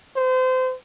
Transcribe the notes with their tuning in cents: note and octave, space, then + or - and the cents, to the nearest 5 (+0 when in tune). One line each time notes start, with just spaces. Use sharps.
C5 -30